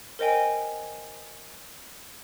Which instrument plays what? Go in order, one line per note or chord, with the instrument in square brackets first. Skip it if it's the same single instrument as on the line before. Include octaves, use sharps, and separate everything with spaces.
[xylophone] A#4 C5 D#5 G5 G#5